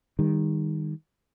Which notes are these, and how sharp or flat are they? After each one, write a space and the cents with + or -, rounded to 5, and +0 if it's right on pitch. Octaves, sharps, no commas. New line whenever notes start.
D#3 +0 G3 +35